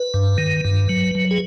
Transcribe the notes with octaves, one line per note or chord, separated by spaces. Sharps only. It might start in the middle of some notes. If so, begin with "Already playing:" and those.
Already playing: B4
G2
D#3
G2
F#3
F#3
G#4